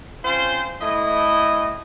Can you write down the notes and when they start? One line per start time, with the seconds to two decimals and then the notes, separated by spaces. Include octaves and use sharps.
0.24 C4 C#4 F4 C5
0.81 A2 A3 E4 D#5